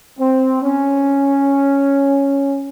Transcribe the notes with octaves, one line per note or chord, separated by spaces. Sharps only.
C4
C#4